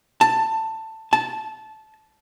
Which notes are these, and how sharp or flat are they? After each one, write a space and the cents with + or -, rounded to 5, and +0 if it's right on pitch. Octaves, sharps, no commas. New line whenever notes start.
A5 +15
A5 -15